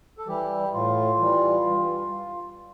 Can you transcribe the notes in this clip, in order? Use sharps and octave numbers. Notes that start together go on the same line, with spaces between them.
A4
E3 G3 G4
A2 F4
E3 G3
G2